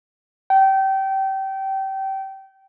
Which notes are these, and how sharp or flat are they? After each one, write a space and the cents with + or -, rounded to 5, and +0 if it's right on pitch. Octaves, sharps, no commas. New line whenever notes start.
G5 -25